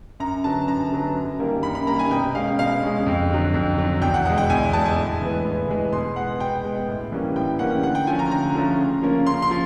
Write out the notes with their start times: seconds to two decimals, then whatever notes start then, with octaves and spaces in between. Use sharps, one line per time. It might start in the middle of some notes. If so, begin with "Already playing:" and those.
0.20 F#2 A#5
0.44 D3 F#3 B3 A5
0.68 F#2 A#5
0.92 D3 F#3 B3
1.16 F#2
1.39 D#3 G3 A#3
1.63 F#2 B5
1.75 B5
1.87 D#3 G3 A#3 A#5
1.99 G#5
2.11 B2 G5
2.35 G#3 C#4 F5
2.59 B2 F5
2.83 G#3 C#4
3.06 F2
3.30 D3 F#3
3.54 F2
3.78 D3 F#3
4.02 E2 G5
4.14 F#5
4.25 B2 G#3 F#5
4.38 G5
4.50 E2 G#5
4.73 B2 G#3 A5
4.85 G#5
4.97 A2
5.21 E3 G#3 B3
5.45 A2
5.68 E3 G#3 B3
5.92 B2 C6
6.16 G#3 B3 F#5
6.40 B2 G5
6.64 G#3 B3
6.88 A2
7.12 E3 G3 A#3 C#4
7.36 A2 G5
7.59 E3 G3 A#3 C#4 F#5
7.83 D3 F#5
7.95 G5
8.07 F3 A3 C#4 G#5
8.19 A#5
8.31 D3 A#5
8.55 F3 A3 C#4
8.79 C#3
9.02 F3 A#3 C#4
9.26 C#3 C6
9.42 C6
9.51 F3